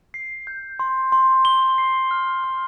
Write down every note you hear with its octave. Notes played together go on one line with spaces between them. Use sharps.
C7
G6
C6
C6
G7
C7
F6
F6